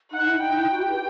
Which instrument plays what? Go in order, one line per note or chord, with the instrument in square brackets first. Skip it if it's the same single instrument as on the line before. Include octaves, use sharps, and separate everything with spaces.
[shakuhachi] D#4 [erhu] F#5
[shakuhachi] E4
[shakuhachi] D#4 [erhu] G5
[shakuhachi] E4
[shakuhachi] F#4 [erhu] G5
[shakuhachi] G4
B4